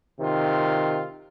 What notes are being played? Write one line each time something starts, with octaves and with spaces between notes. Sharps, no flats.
C3 D#3 F4